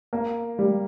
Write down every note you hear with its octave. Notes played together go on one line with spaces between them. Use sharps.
A#3
G3